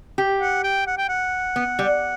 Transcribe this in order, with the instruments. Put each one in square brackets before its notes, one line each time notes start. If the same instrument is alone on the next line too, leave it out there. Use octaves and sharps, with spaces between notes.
[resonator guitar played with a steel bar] G4
[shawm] F#5
G5
F#5
G5
F#5
[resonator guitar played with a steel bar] B3
G3